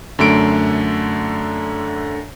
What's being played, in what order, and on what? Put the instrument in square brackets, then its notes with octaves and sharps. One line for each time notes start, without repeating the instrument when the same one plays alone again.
[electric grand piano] F#2 D3 A3 D7